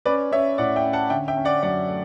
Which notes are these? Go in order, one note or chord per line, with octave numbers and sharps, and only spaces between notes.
C#4 B4 D5
C#4 C#5 E5
A2 D5 F#5
E5 G5
C#4
F#5 A5
D3 E5 G5
E5 G5
C#4
D5 F#5
F#2 D5 F#5
A3